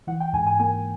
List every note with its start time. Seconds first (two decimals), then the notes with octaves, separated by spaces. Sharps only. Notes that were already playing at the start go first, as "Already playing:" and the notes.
0.07 E3 F#5
0.20 G5
0.33 G#2 G#5
0.47 G#5
0.60 A#3 G#5